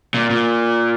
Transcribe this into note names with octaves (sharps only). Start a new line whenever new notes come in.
A#2
A#2